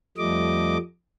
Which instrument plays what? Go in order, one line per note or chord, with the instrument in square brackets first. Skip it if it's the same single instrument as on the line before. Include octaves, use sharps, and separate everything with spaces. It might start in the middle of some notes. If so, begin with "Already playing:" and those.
[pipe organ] F2 F3 G3 A3 D#5 D6